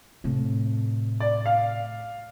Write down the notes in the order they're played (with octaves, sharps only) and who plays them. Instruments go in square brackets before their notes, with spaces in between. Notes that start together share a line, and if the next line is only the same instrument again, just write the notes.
[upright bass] A2 C3
[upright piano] D5
F5